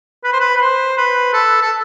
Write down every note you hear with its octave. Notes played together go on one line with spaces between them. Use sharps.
B4
C5
B4
B4
C5
B4
A4
A4